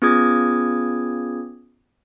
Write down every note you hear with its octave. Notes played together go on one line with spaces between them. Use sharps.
B3 C#4 F4 G#4 D#6 G#6